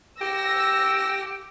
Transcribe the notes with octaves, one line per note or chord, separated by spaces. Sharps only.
G4 E6 A#6